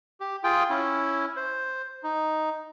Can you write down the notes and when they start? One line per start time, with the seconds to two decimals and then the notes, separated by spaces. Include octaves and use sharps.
0.20 G4
0.44 F4 G#4 G5
0.70 C#4 E4
1.36 C5
2.03 D#4